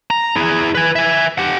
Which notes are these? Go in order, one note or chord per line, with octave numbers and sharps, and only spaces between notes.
A#5
E4 G#4
B4 G#5
E5 G#5
G4 F#5